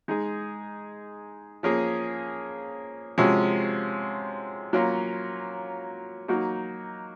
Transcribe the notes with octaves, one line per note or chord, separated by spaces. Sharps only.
G#3 D#4 G#4
F3 A#3 C#4 G#4
C3 F3 G#3 C#4 F#4
F#3 A#3 C#4 F4
F#3 A#3 D#4 F#4